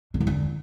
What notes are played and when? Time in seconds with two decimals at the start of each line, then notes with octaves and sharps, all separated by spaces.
0.14 D3
0.20 E2
0.27 D3